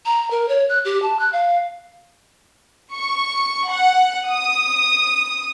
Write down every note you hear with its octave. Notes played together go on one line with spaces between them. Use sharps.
A#5
A#4
C#5
F#6
G4
A5
F#6
F5
C#6
F#5
D#6